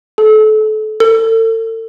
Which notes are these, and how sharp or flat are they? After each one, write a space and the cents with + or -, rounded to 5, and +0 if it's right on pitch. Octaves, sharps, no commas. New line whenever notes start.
A4 -30
A4 +40